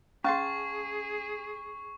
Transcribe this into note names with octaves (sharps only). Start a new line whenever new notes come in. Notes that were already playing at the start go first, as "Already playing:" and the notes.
C#4 G#4 F5 A5 C6 C#6